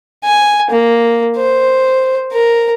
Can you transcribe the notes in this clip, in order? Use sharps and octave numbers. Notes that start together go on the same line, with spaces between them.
G#5
A#3
C5
A#4